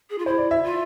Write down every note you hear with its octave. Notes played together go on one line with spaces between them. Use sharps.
G#4
F4
E4 C5
D5
E5
F4